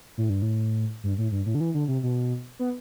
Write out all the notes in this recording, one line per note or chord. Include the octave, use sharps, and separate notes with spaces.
A2
G2
A2
G2
A2
G2
A2
D3
E3
D3
C3
B2
B3